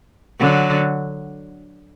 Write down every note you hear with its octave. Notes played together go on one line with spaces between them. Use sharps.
D3 F#3